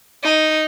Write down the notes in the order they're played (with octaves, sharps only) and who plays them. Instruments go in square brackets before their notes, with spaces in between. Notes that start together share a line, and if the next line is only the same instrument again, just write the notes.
[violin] D#4